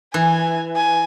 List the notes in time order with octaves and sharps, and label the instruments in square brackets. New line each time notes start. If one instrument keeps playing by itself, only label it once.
[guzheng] E3 [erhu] G#5
[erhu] G#5